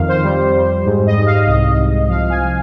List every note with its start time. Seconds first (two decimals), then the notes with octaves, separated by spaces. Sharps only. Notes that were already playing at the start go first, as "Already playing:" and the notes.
Already playing: F2 D#3 F5
0.08 C5
0.23 G3
0.55 G3
0.85 G#2
1.06 D#5
1.16 G#2
1.26 F5
1.47 C2 D#5
1.78 C2
2.09 F3 F5
2.30 G#5